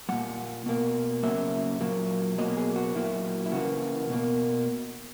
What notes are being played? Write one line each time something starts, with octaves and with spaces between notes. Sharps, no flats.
A#2 G#3 F#5
B2 A#3
C#3 F#3 A#3 E5
A#2 F#3 A#3
B2 F#3 A#3 D#5
G#4
F#4
A#2 F#3 A#3 E4
E4
C#3 E3 A#3 F#4
B2 A#3